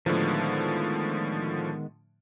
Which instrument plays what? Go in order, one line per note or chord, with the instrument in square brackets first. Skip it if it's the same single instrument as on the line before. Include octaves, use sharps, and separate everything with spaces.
[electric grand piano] A2 D3 F3 [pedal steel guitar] D#3 G#3 B3